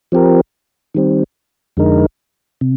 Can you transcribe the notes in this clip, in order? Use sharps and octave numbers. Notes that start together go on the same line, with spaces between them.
F3 C4 G4 A#4
D#3 G3 C4
F2 D3 G#3 D#4 A#4
C3